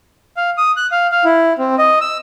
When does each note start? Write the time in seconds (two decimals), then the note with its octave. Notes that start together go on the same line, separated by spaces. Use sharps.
0.37 F5
0.58 D#6
0.77 F#6
0.92 F5
1.12 F5
1.24 E4
1.58 C4
1.78 D#5
2.01 E6